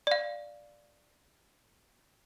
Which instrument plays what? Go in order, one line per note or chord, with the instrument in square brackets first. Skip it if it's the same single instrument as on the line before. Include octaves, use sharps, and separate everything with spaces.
[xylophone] D5 F5